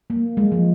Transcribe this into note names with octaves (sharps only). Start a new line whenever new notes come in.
A#3
G#3
F3